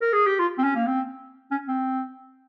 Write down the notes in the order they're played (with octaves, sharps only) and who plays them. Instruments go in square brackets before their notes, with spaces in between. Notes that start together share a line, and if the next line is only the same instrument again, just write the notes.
[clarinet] A#4
G#4
G4
F4
C4
C#4
A#3
C4
C#4
C4